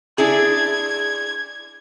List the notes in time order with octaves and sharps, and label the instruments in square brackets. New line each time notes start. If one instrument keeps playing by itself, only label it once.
[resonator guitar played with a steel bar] D4 E4 G#4 [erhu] G#6